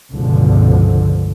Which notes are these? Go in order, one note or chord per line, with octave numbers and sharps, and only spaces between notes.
G1 C#2 B2 D3 F3